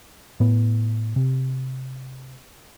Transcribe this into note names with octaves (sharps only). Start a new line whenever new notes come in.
A2 B3
C3